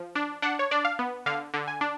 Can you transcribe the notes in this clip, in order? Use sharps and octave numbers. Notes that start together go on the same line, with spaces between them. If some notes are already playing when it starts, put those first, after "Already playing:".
Already playing: F3
D4
D4 F#5
C#5
D4 D5
F5
B3
D3 F5
D3
G#5
D4